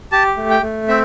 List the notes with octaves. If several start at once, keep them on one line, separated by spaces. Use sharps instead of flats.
G4 A5
A3
G5
A3
C4 E5